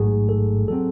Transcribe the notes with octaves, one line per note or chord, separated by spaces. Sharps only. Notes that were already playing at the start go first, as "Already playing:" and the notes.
Already playing: A1 G#2 F#3 A3 G#4
A4
F#3 C4 A4